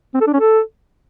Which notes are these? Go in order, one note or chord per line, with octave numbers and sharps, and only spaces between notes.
C4
A4
D4
C#4
A4